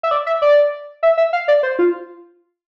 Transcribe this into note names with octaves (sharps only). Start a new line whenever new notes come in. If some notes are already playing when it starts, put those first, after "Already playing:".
E5
D5
E5
D5
E5
E5
F5
D5
C5
F4